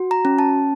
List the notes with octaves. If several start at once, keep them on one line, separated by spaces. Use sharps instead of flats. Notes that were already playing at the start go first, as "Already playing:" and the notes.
Already playing: F#4
A#5
C#4
A5